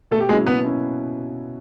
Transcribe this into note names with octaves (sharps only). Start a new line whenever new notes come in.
B2 A3 A4
G4
F#3 G#3 A#3 C#4 E4 G#4
B2 B3 B4
C#4 E4